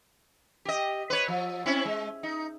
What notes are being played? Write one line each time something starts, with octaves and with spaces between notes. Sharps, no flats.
G4 D#5
B4 C#5
F3
C4 C#4 E4
G#3
D#4